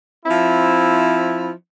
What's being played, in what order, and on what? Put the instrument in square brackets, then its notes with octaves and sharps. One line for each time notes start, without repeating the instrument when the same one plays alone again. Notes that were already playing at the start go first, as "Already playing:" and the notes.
[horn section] F3 C4 E4